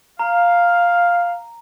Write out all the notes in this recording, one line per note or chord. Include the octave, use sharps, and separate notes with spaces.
F5 A#5